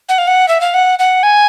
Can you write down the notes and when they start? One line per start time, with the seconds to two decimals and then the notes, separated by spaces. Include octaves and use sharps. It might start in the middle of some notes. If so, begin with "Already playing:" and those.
0.09 F#5
0.18 F5
0.27 F#5
0.48 E5
0.61 F5
0.74 F#5
0.99 F#5
1.23 G#5